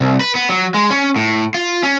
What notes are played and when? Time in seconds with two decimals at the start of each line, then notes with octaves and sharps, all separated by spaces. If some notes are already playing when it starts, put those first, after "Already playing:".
0.01 C2
0.21 B4
0.35 B3
0.49 F#3
0.74 G#3
0.91 C#4
1.16 A2
1.54 F4
1.83 C#4